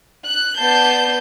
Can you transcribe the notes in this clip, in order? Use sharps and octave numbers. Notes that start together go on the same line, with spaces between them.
F#6
B3 D5 A5 G6 C7